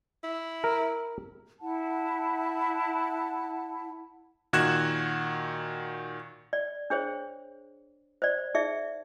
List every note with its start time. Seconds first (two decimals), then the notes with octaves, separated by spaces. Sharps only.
0.23 E4
0.64 A#4
1.60 E4 F#5 A5
4.53 A#2 D#3 F#4 F#6 G#6 E7
6.53 D5
6.90 D4 G#4 C5 C#5
8.22 C5 D5
8.54 D#4 G#4 D5 E5